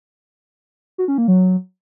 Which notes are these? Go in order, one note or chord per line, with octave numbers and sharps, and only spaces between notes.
F#4
C#4
A#3
F#3